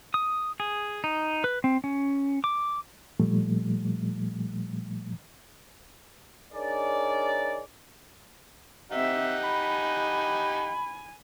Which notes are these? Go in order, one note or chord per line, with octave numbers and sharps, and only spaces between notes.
D#6
G#4
D#4
B4
C4
C#4
D6
A#2 F3 G3 A3
D4 D#4 G#4 A#4 C#5 D5
C4 D#4 G4 E5 F#5
G#5 B5